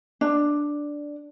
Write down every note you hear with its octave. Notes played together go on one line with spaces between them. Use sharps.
D4